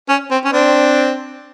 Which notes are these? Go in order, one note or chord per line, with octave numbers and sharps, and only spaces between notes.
C#4
C4
C#4
C4 D4